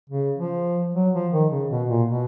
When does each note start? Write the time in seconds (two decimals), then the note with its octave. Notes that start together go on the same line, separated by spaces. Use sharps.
0.10 C#3
0.38 F3
0.95 F#3
1.14 F3
1.33 D#3
1.52 C#3
1.70 B2
1.89 A#2
2.09 B2